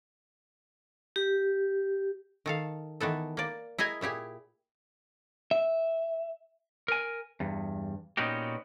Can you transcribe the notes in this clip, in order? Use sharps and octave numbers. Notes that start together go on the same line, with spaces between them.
G4
D#3 A4 F5
D#3 E3 B3 A4
A#3 D5
E4 G#4 D#5 G#5 A#5
A#2 E4 G4 G#4
E5
A#4 G#5
E2 G2
A#2 B3 C#4 D#4 F#4 G4